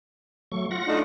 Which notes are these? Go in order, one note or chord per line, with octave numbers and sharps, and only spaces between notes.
F#3 A3 C#6
F4 F#5 A#6
A3 D4 D#4